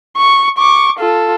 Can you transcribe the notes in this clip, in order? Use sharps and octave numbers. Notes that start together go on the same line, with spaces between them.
C#6
C#6 D6
F4 A4